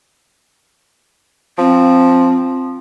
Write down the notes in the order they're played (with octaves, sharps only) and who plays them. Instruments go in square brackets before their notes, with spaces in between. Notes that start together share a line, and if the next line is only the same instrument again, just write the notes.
[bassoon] F3 [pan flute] C4